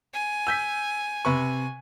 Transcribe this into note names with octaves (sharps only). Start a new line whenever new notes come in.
G#5
E6 G6 B6
C3 B4 C#6